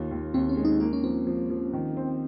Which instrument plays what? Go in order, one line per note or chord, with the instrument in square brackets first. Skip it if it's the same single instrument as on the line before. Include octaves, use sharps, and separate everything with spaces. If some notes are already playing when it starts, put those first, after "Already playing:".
Already playing: [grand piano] D#2 F4
D#2
[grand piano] D#2 [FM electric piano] C4
[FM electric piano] C#4
[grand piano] G#3
[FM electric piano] D#4
[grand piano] A#3 [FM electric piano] D#4
[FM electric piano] C#4
[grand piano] F3 [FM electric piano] C4
[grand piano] F3
F3
D#3
C4